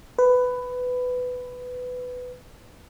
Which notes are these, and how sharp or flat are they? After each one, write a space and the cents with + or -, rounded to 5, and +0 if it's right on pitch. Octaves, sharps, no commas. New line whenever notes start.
B4 +15